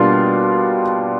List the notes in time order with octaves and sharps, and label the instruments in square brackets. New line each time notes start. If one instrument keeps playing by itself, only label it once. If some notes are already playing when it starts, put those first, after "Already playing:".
Already playing: [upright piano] B2 G3 A#3 D4 F4 C6